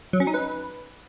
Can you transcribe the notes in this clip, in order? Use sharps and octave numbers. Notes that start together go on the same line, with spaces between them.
F#3
C#4
D#4
B4